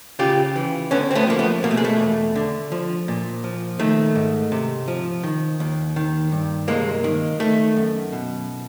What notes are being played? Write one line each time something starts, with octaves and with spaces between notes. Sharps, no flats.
C#3 F4 G4
E3
D3 B3 C#4
C4
A3 B3
F3 A#3
A3 B3
B2 A#3
A3
G#3
A3
E2
D3
F3
A#2
F3
D#3 A3
G#2
C3
F3
D#3
D#2
D#3
G2
C3 G#3 A#3
D#3
D#3 A3
F#2
B2